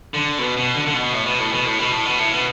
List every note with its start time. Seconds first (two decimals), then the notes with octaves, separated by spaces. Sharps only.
0.14 D3
0.38 B2
0.57 B2
0.75 D3
0.86 D3
0.94 B2
1.13 A2
1.26 B2
1.39 A2
1.52 B2
1.65 A2
1.79 B2
1.92 A2
2.06 B2
2.19 A2
2.32 B2